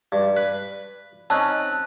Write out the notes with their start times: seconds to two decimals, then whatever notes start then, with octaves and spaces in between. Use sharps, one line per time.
0.12 G2
0.37 B4
1.30 C4 C#4 D#4 A5 F#6